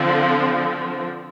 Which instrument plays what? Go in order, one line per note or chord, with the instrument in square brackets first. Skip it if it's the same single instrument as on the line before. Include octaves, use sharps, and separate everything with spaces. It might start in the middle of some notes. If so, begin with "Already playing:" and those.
Already playing: [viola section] D3 F3 C4